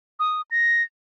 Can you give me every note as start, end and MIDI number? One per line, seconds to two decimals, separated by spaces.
0.20 0.42 87
0.51 0.83 94